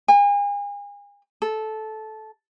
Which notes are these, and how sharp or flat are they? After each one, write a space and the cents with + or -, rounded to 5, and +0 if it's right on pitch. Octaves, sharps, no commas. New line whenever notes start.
G#5 -40
A4 -15